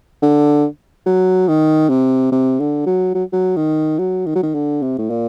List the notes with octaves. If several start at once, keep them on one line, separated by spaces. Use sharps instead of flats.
D3
F#3
D#3
C3
C3
D3
F#3
F#3
F#3
D#3
F#3
D#3
F#3
D#3
D3
C3
A2
A#2